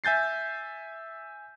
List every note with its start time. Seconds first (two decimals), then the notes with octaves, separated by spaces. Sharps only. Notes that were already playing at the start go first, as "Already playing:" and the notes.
0.04 E5 G#5 G6 A6 C7